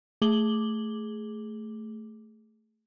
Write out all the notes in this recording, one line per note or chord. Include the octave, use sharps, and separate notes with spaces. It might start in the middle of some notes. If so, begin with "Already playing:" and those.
A3 G#4 D6 F#7 G7